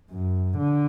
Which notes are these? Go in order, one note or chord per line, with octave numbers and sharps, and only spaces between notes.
F#2
D3